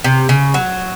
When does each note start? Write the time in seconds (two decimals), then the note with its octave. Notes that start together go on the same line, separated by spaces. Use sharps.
0.04 C3
0.29 C#3
0.54 F#3